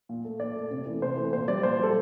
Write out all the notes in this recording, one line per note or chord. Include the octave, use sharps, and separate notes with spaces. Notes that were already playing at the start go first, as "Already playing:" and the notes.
A#2
A3
A#2 D5
A3
C3
E3 A3
C3 C5
E3 A3
A#2 C5
G3 D5
A#2 C5
G3 A4